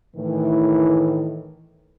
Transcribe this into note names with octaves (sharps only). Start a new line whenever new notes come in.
A2 D#3 E3